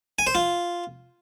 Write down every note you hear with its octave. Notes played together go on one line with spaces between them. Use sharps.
G#5
C5
F4